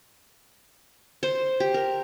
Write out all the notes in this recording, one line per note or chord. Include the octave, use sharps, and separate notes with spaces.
C5
G4
A#4